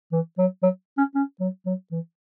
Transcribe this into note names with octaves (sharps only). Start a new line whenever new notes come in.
E3
F#3
F#3
C#4
C#4
F#3
F#3
E3